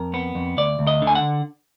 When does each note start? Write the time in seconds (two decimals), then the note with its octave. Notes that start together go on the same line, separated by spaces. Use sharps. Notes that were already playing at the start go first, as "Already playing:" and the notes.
Already playing: F2 A#4
0.14 B3
0.35 F2
0.57 D2 D5
0.79 D2
0.87 D#5
1.02 D3
1.07 G#5
1.15 F#5